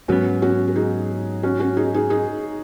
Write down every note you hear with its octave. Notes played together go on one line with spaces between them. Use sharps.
G#2 F#3 B3 C#4 F#4
C#4 F#4
F#4
D#4 G#4
C#4 F#4
C#4 F#4
D#4 G#4
D#4 G#4
D#4 G#4